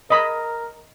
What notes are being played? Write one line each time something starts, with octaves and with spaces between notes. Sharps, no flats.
A#4 D#5 B5